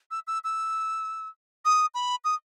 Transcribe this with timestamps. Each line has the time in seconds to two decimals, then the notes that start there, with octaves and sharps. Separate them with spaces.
0.11 E6
0.27 E6
0.44 E6
1.65 D#6
1.95 B5
2.24 D#6